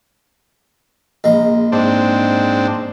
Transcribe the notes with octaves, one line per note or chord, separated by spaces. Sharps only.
A#1 G#3 A#5
G#2 C4 D4